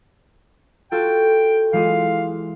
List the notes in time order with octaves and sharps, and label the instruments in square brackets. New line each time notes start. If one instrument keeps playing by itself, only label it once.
[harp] F4 F#4 A4 [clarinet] G5
[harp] E3 G#3 F4 [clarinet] F5